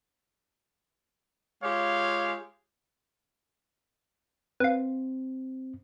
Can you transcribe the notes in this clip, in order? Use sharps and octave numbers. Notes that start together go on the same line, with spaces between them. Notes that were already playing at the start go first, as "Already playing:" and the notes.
G#3 F4 G4 C#5 F5
C4 B4 F5